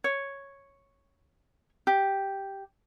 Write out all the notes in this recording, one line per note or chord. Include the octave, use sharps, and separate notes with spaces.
C#5
G4